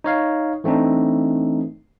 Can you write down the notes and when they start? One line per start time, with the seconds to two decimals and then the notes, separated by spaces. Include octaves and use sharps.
0.04 D#4 C#5 F5
0.64 E3 A3 C4 D4 D#4